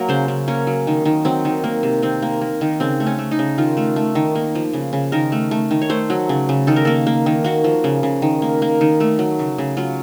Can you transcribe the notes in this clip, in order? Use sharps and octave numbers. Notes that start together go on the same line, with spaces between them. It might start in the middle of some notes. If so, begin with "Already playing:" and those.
Already playing: F#3 A#3 A#4
C#3 C5
C#3
A#3 C#4
F#3
D#3
D#3
F#3 C4
D#3
A#3
C3
D#3 C4
A#3
A#3
D#3
C#3 C4
A3
C#4
A3
D#4
C#3
D#3 F4
A3
A3
D#3
A#3
F3
C#3
C#3
D#3 A#4
A3
A3
D#3
C#5
A3 C5
F#3
C#3
C#3
D#3 A4
A#4
A#3 A4
A#3
D#3
A#3 F#4
F3
C#3
C#3
D#3
A#3
A#3
D#3
A3
F#3
C#3
C#3
F#3 F4